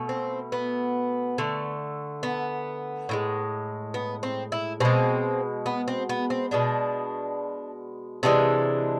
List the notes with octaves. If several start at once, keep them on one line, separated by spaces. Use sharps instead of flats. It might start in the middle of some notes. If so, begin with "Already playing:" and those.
Already playing: B2 A3
C4
B3
D3 A3
B3
A2 F3 G#3
B3
C4
E4
B2 G#3 C4
B3
C4
B3
C4
B2 G#3 D4
C3 E3 G#3 D4